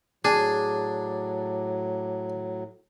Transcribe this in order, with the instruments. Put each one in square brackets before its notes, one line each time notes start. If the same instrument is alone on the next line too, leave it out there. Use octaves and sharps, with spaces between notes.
[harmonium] A2 F#3 [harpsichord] D4 [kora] G#4